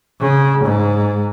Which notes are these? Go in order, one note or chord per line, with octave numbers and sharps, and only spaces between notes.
C#3
G#2